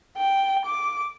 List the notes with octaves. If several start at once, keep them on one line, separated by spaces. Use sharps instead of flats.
G5
D6